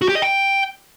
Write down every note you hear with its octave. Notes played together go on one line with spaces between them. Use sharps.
F#4
G4
D#5
G5